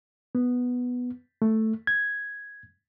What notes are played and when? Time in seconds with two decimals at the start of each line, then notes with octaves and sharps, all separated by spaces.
0.35 B3
1.42 A3
1.87 G#6